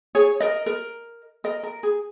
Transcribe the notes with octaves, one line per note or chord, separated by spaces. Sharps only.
G#4 C#5
A#4 D#5
A#4 D#5
A#4 D#5
A#4
G#4